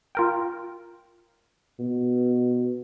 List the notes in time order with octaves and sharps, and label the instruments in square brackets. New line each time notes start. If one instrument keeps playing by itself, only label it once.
[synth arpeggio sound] F4 A#4 G5
[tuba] B2